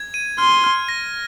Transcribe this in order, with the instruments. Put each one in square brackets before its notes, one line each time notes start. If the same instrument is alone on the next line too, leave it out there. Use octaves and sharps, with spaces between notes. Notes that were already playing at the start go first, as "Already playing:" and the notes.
Already playing: [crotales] G#6
D#7
[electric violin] C6 [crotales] F6
[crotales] F6
A#6